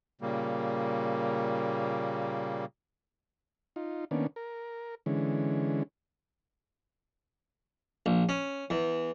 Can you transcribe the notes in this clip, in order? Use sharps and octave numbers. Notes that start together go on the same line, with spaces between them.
A#2 C#3 G3 A#3
D#4 F4
D#3 A#3 B3 C#4 D4
A#4
D3 E3 G#3 C#4
A#1
C#4
E2